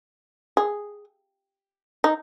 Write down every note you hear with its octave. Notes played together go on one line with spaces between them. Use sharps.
G#4
D#4